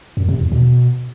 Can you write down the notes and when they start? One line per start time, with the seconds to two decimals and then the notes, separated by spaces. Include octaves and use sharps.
0.17 F#2
0.29 C3
0.40 E2
0.52 B2